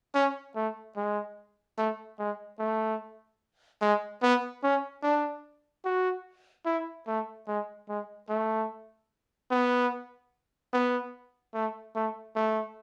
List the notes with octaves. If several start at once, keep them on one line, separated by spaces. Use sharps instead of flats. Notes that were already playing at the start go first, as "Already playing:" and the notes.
C#4
A3
G#3
A3
G#3
A3
G#3
B3
C#4
D4
F#4
E4
A3
G#3
G#3
A3
B3
B3
A3
A3
A3